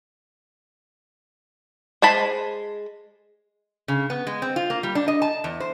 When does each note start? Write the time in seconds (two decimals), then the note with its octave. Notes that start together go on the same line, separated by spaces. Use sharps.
2.02 G#3 C5 A5 B5
3.88 C#3
4.10 B3
4.27 G#3
4.42 C4
4.56 F4
4.70 A#3
4.83 G3
4.95 D4
5.08 D#5
5.22 A5
5.44 E2
5.60 C5